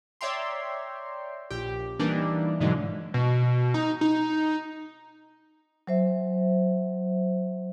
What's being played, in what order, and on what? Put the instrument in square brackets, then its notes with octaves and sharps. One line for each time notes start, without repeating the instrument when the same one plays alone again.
[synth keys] C#5 D5 E5 G5 A#5 C6
A#1 G4
E3 G3 A#3 D4 D#4
G#2 B2 D3 E3 F#3 G#3
[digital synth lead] B2
D#4
D#4
[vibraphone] F#3 C5 E5